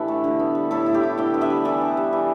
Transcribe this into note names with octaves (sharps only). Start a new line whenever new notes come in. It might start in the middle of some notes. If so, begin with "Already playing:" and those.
Already playing: A2 E3 D4 E4 G4 A4 B4
A3
D3
B3
G3
A2 E4 A4
E4
G4
A3
D3 D5 G5
B3
B4 E5
G3
E3 A4 D5
D4
G3
E3